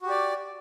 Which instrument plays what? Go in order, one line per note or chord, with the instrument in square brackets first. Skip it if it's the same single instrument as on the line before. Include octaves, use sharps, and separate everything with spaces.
[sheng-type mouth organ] F#4
G4
D5